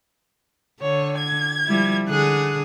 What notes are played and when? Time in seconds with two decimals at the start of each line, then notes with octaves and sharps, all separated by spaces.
0.81 D3 C#5
1.17 G#6
1.66 F3 G3 E4
2.08 D3 G#4 F#6